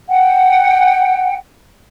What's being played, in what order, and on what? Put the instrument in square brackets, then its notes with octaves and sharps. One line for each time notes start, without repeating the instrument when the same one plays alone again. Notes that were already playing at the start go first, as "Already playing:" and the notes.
[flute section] F#5 G5